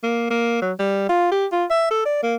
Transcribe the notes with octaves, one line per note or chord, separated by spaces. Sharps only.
A#3
A#3
F#3
G3
F4
G4
F4
E5
A4
D5
A#3